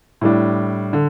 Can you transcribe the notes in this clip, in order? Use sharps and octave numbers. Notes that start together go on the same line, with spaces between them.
A2 G3 D4
D3